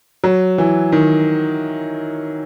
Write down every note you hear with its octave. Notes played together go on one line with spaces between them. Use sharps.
F#3
E3
D#3